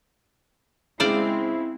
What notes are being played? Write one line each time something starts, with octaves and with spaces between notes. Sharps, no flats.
C#3 G#3 C4 E4 C5 D5 F5